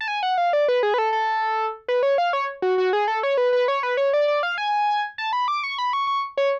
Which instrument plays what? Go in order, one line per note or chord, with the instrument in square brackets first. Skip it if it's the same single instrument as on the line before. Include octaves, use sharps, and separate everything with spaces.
[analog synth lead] A5
G#5
F#5
F5
D5
B4
G#4
B4
A4
A4
B4
C#5
F5
C#5
F#4
F#4
G#4
A4
C#5
B4
B4
C#5
B4
C#5
D5
D5
F5
G#5
A5
B5
D6
C#6
B5
C#6
C#6
C#5